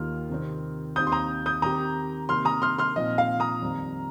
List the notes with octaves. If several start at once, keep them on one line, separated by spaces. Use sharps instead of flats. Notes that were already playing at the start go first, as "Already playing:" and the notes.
Already playing: D#2 D#3 A#3 F4 F6
C3 D#3 C4
D#2 D#3 C4 D#4 C5 D#6 G6
C6
A#5 D#6
D#6 G6
D#3 C4 G4 A#5 D#6
C3 D#3 A#3 C6 F6
A#5 D#6
C6 F6
C6 F6
A#2 F3 C4 D#4 D#5
F5
A#5 D#6
F2 D#3 G3